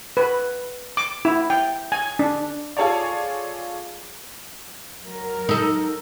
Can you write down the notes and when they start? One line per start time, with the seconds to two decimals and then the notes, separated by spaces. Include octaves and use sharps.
0.17 B4
0.97 D6
1.25 E4
1.50 G5
1.92 G#5
2.19 D4
2.77 F4 G#4 A4 C#5 D5
5.04 F#3 A#4
5.49 D#4 A4